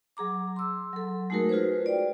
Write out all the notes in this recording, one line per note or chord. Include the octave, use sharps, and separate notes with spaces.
F#3 G#4 A#5 D6
C6 E6
F#3 A4
G#3 A3 D#4 F#4 G#4 A#4
F4 F#4 G#4 B4 C5
D5 G5